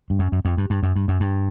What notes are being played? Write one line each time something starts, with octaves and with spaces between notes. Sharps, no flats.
G2
F#2
F#2
F2
G2
G2
F#2
G2
F#2
G2